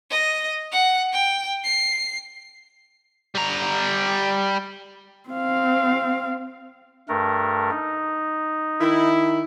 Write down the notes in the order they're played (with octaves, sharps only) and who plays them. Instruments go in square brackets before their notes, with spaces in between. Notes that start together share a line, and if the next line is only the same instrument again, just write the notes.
[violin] D#5
F#5
G5
C7
[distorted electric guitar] G3 A#5
[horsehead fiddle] C4 F5
[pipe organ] G2 A3 A#4
D#4
[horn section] D#3 E4